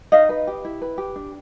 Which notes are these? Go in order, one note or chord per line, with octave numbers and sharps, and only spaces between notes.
D#4 D#5 F5
B4
G4
E4
B4
G4
D4